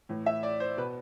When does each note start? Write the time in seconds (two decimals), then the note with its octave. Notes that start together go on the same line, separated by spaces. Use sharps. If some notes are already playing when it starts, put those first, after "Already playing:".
0.09 A2 E3
0.26 E5
0.43 D5
0.60 C5
0.77 B2 B4